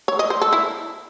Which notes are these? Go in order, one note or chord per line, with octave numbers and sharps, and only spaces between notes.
C#5
D#5
C5
A4
E4